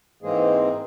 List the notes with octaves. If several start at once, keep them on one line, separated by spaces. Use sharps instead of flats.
G#2 E3 G#3 A#3 C4 G#4